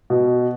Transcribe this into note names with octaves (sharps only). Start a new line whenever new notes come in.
B2